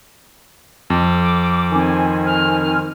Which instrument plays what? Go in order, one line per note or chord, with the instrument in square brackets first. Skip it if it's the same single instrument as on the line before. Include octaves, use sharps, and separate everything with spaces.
[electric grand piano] F2 [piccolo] D6
[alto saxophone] D#3 [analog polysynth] C4 G#5
[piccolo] F6